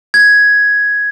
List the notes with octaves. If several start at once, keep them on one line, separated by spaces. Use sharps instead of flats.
G#6